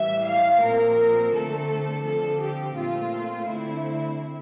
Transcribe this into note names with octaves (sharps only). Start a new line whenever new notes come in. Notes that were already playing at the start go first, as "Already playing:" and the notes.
Already playing: A2 E3 G3 E5
F5
A#2 F3 C4 A#4
D3 A3 C4 A4
D3 F3 C4 A4
G4
A#2 A3 C4 F4
D3 A3 C4 E4